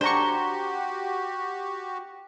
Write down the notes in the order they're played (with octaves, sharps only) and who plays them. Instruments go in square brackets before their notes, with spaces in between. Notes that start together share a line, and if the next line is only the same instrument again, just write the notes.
[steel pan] D4 C#6 [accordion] F#4 G4 [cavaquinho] C5 A#5